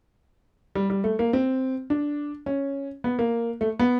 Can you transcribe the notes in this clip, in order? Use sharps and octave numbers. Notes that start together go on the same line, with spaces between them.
G3
G3
A3
A#3
C4
D4
C#4
B3
A#3
A3
B3